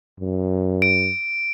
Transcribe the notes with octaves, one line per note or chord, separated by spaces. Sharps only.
F#2
D7